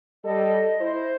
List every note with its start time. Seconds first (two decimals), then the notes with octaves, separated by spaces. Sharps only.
0.25 G3 A4 D#5
0.81 E4 C5